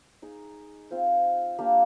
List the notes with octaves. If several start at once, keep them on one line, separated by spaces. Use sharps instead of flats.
D#4 G#4 D#5
C4 F4 C5 F5
A#3 D4 G4